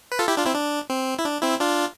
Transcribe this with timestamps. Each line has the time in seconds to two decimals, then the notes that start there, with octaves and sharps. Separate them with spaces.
0.12 B4
0.19 F4 A4
0.28 E4 G4
0.37 D4 F4
0.45 C4 E4
0.55 D4
0.90 C4
1.19 E4
1.25 D4
1.43 C4 E4
1.60 D4 F4